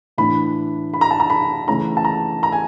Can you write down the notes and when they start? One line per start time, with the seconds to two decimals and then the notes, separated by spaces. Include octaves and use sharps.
0.18 A2 E3 A3 D4 B5
0.93 B5
1.01 A#5
1.11 A5
1.20 A#5
1.30 B5
1.68 C#3 E3 A3 C#4 A#5
1.97 A5
2.05 A#5
2.43 A#5
2.52 G#5